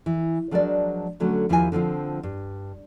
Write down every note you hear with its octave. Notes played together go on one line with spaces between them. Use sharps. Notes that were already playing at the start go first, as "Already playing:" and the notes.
E3
F3 F#3 G#3 D4 A#4 D5
D3 F#3 A3 C#4
D#2 F3 E4 A#4 D5 G#5
D3 F3 C4 F4
G2